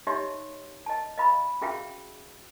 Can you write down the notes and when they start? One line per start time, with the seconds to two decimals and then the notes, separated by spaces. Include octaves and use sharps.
0.07 D#4 G4 C#5 D#5 E5 C6
0.86 D#5 A5
1.18 D#5 F5 B5
1.61 C#4 F#4 G#4 E5 F5 G5